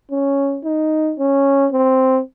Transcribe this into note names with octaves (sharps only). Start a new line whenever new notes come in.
C#4
D#4
C#4
C4